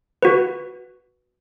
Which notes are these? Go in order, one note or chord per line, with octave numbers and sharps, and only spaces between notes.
F#4 B4